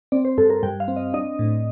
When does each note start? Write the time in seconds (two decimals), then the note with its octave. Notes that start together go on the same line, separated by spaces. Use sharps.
0.12 C4 D5
0.25 C5
0.38 G2 A4
0.50 A#4
0.63 G2 G5
0.80 F5
0.88 C4
0.96 D#5
1.14 D4 D#5
1.39 A2